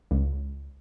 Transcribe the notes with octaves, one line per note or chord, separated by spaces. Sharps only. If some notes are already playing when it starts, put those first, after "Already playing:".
C#2